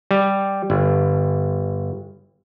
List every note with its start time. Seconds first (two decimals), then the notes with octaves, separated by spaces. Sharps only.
0.11 G3
0.70 G1